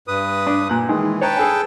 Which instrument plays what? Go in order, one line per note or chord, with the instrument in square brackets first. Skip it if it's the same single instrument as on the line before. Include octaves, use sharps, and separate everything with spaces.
[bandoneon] G2 B4 D#6
[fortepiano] D4
A#2 F#6
[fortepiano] D#3 G#3 [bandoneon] E3
[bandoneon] B4 G5 A5 [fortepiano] C#5 A#5
[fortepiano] G#4 A4 G#5